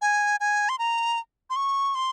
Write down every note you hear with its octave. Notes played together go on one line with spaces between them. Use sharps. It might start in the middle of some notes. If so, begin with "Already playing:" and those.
G#5
G#5
C6
A#5
C6
C#6
C6